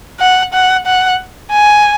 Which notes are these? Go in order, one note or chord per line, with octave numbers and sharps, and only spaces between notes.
F#5
F#5
F#5
G#5